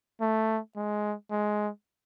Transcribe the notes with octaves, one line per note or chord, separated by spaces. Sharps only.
A3
G#3
G#3